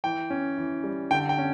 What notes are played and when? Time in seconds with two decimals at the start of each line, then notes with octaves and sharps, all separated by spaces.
0.04 E3 G5
0.30 C#4
0.58 E3
0.84 G3
1.11 D3 G5
1.29 G5
1.38 C#4